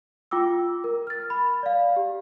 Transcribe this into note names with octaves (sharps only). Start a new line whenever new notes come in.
F4 G5 D6 E6
A#4
F6 A6
B5
D5 F5
G4